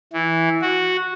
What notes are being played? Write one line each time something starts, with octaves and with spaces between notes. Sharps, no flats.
E3
F#4